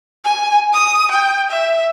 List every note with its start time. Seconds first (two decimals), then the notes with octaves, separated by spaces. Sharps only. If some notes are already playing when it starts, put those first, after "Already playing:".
0.24 G#5
0.73 D#6
1.11 G5
1.50 E5